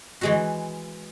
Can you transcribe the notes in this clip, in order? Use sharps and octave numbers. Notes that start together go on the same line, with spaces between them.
E3 G#3 F#4